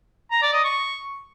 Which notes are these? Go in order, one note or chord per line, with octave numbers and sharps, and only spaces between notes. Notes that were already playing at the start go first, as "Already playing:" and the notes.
A#5
D5
D#5
C#6